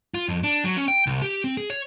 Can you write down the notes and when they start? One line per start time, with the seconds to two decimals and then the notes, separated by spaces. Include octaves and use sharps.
0.14 F4
0.29 F2
0.43 D4
0.64 F#3
0.77 C#4
0.88 G5
1.07 C2
1.22 G4
1.44 C4
1.57 G#4
1.70 C#5